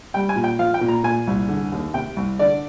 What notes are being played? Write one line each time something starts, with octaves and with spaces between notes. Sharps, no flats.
G3 G5
G#5
A#2
G5
F3 F5
G5
A#2
A#5
A#2 G#5
C2
D3
D#2
C3 G5
C2
D3 D5